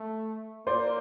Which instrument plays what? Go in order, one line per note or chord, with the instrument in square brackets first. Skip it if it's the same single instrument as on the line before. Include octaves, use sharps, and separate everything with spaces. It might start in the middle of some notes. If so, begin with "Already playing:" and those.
Already playing: [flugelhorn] A3
[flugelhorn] A#3 [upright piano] C5 D5